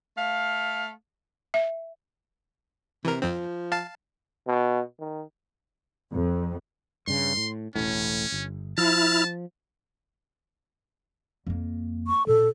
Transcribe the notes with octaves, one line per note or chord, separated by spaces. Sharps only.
A3 F5
E5
C3 E3 A#4
F2 F3 C4
F5 A5
B2
D#3
F2
G2 C#3 C6
A2
E1 A1 A2 C#4
G1
F3 E4 A5 F6
F2 A#3
C#6
A#2 A4